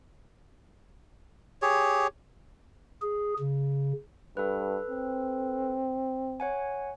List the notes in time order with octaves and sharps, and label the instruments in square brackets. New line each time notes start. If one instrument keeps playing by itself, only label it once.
[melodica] G4 G#4 C#5
[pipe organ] G#4
C#3
[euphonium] G2 [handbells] A4 B4
[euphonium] C4
[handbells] C#5 F#5 G#5